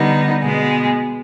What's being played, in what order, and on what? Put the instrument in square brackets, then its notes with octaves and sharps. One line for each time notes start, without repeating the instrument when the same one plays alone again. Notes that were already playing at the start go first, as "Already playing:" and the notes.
Already playing: [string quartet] D3 G3 B3 D#4
B2 G#3 B3